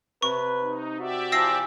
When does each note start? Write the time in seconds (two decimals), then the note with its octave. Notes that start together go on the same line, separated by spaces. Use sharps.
0.22 C3 B4 C#6
0.61 D#4
1.00 F#4 G4 D5 E5
1.32 E3 F3 E6 A#6 C7